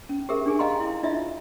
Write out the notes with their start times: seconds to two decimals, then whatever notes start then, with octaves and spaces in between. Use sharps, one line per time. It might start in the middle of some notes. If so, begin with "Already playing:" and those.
0.09 C#4
0.29 G4 G#4 A#4 E5
0.46 D4 G#4 G#5
0.59 D#5 F5 G5 A#5 C6
0.80 E4
1.03 D4 E4 F4 D#5 E5